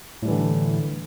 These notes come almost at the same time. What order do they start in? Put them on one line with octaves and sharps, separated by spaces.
A2 G3 E3 D3